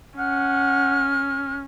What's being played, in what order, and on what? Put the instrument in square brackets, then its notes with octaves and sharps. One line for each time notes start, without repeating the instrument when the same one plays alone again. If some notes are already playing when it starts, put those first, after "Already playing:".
[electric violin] C#4 [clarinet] F#5 [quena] F6